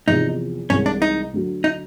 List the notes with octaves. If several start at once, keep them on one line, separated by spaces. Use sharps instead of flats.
E2 C3 F3 D#4
C2 C3 E3 G#3 C#4
D4
D#4
D2 D3 F#3
D#4